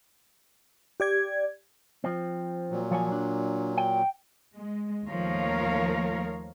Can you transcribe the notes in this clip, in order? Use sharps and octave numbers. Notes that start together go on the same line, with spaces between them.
G4 D5 G#6
F3 C4
A#2 F#3
F3 C#5 G#5
D4
G5
G#3
D#2 F3 A3 A#4 C#5 F5